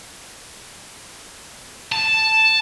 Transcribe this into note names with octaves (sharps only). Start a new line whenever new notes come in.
A5